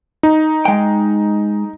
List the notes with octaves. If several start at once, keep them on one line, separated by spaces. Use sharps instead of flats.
D#4
G#3 G5